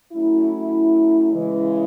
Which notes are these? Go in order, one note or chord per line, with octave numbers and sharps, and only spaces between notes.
F#3 A3 C#4 E4
C#3 E3 G#3